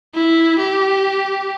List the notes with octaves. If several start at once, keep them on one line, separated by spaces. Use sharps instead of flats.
E4
G4